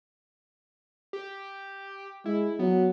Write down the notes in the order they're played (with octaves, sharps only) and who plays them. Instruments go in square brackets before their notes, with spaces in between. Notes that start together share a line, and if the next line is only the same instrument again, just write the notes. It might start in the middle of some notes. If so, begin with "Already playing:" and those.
[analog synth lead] G4
[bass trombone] G#3 [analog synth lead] E4
[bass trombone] F#3 [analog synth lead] B3